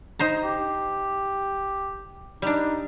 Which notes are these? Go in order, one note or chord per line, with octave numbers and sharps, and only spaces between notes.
D#4 C5 A#5
G4
G3 D4 D#4